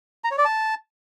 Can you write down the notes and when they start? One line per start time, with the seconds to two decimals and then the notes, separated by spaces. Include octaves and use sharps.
0.24 A#5
0.31 C#5
0.38 D5
0.45 A5